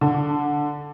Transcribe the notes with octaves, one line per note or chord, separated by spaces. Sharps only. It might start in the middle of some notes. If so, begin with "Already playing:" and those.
D3